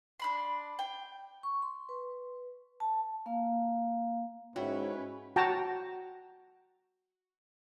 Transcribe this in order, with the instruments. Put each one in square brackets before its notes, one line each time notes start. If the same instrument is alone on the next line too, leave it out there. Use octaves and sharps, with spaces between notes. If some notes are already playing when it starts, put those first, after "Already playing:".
[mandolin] D4 B5 C6
G5
[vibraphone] C#6
C6
B4
A5
A#3 F5
[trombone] G#2 [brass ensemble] C#4 E4 B4 [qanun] F#4 [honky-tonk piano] C#5 E5 G5
[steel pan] F#4 G5 A5 A#5